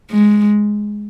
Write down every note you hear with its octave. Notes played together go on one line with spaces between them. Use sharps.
G#3